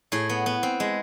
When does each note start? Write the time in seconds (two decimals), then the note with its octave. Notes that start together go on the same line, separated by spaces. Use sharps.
0.12 A2 G#4
0.29 B3
0.46 B3
0.63 C4
0.80 G#3